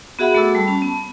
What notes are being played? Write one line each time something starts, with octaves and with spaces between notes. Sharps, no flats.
B3 F#4 G#4 E5 F#5 B5
A3 F#4 A4 D6 E6
G3 A5 B5
C#4 A5
B3